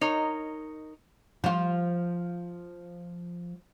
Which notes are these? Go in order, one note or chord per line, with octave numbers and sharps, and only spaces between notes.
D#4 A#4 C#5
F3 F4